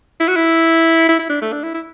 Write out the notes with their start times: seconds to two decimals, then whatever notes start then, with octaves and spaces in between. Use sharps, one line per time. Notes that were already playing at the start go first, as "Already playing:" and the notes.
0.20 E4
0.28 F#4
0.36 E4
1.09 E4
1.19 E4
1.30 D4
1.42 A3
1.53 D4
1.63 E4
1.74 E4